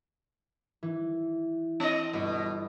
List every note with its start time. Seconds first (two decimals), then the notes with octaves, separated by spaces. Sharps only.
0.83 E3
1.80 C4 D#5
2.13 G1 B2